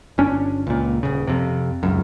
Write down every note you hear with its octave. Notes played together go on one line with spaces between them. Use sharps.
G1 C#4 D4
C#2 A#2
D#1 C#3
F2 C3
D#1 C#2 F#2